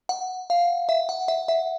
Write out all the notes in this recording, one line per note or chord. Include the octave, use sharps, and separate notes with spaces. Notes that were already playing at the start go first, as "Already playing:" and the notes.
F#5
F5
E5
F#5
E5
E5